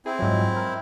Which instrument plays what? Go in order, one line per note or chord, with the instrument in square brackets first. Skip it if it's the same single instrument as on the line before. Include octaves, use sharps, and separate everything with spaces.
[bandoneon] C4 E4 [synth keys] G#4
[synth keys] G#2 F3 F#3
A#4